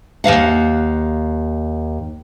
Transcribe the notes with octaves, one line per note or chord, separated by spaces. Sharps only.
D#2 D#3 F5 F#5